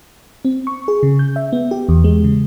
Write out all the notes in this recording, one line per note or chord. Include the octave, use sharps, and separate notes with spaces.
C4
C#6
G#4
C#3
G6
E5
B3
G4
E2
G#3
C#3